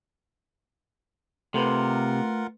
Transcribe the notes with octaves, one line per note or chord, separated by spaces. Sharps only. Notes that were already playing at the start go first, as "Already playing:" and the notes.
C3 A3 F4 A#4 B4 F#5